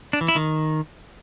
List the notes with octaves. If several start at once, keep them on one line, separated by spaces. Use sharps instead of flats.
D4
E3
E4
D#3